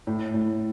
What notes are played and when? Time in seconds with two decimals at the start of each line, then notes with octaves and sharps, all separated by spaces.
0.07 A2
0.34 A2